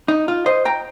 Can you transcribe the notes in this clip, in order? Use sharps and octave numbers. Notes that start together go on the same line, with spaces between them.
D#4
F4
C5 D#5
G5 A#5